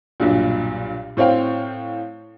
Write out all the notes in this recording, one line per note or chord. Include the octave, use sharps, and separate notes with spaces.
B1 G2 A#2
A2 C4 C#5 F5 G5